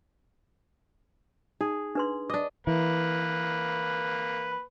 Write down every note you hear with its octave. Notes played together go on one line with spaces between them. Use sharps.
D#4 G#4
D4 B4 C6
D4 D#5 D6
E3 A#3 B4